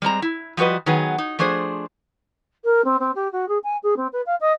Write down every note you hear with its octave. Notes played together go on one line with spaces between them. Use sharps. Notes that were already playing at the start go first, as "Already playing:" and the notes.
G3 G#3 C4 A#5
E4
F3 G3 F#4 B4 D#5
D#3 F#3 B3 G#4
D#4
F3 A3 D4 G#4 C5
A#4
C4
C4
G4
F#4
G#4
G#5
G#4
C4
B4
F5
D#5